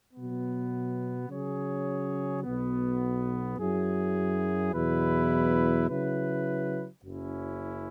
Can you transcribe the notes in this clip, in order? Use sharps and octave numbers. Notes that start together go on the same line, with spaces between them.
B2 F#3 B3
C#3 F#3 C#4 G#4 C#5
B1 B2 B3
F#2 F#3 E4 G#4
E2 B2 F#3 E4 B4
C#3 F#3 E4 B4
F#1 F#2 F#3 C#4 E4